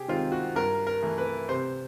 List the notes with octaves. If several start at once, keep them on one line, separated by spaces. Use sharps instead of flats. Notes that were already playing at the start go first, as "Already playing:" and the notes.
Already playing: C3 G4 G#4
D#3 G#3 C4 F4
F#4
G2 A#4
A#4
E3 A3
B4
C3 C5